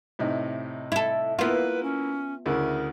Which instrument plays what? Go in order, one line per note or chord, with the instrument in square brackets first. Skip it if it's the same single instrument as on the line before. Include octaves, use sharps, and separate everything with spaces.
[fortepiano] A2 C3 D#4
[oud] E4 A4
[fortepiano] A#3 E4 [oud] B3 F4 [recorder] B4
[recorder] C#4
[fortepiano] D2 C#3 E4 [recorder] A#4